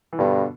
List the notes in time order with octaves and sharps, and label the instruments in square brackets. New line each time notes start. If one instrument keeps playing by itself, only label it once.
[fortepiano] E3
[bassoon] G2 [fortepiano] B2 D3